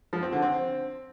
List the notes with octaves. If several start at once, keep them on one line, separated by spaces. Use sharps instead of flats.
F3
C4
D3
C4